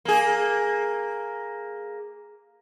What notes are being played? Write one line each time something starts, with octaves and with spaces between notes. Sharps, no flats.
A#3 G#4